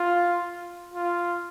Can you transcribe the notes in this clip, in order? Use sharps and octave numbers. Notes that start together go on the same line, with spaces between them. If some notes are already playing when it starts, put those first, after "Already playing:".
Already playing: F4
F4